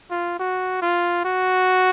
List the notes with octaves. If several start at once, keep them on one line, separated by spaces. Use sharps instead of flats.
F4
F#4
F4
F#4